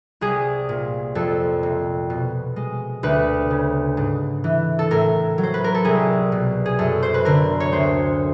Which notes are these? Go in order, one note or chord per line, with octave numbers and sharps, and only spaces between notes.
C2 G#4
A#2
F2 A4
C3
B2
G#3
D2 B4
C#3
G#2
E3
A4
A2 A#4
F#3
C5
B4
A#4
A4
C2 G#4
B2
G#4
F#2 A4
C5
B4
D3 A#4
C#5
D2 C5